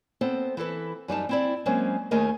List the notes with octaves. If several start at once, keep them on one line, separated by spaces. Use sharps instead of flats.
B3 C4 A4 C5
E3 E4 A4 B4
F#2 G3 D#4 A5
C4 E4 D5
F#3 G#3 A#3 C4 C#4
D#2 A3 D#4 G#4 A#4 D#5